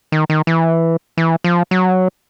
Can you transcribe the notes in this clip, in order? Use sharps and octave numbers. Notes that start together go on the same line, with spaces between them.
D#3
D#3
E3
E3
F3
F#3